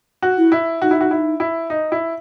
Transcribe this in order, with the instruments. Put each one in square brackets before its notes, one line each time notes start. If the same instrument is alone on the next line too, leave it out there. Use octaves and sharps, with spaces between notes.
[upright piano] F#4
[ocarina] E4
[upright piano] E4
[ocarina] D#4 [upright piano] F#4
[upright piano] E4
F#4
E4
E4
D#4
E4